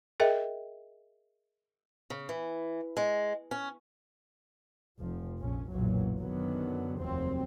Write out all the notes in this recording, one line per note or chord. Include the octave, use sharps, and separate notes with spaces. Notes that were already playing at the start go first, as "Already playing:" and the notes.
G#4 A#4 D#5 E5 G5
C#3
E3
G#3
C#4
F1 F3
A#1 C#4
F#1 B1 A#2 E3 F#3
F#2 D3 D#3 F#3 B3
F1 D#2 F#3 C4